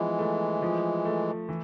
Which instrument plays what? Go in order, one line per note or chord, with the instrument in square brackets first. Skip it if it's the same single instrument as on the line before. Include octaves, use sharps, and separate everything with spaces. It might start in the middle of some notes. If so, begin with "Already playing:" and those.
Already playing: [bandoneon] E3 G#3 [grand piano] F3 B3
[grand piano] A3
F3
A3
E3